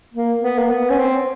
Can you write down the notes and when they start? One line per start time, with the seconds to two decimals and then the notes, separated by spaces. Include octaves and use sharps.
0.14 A#3
0.41 B3
0.58 A#3
0.70 B3
0.90 C#4
0.98 C4